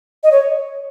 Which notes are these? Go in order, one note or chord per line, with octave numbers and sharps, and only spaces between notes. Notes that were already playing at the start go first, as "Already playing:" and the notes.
D#5
C#5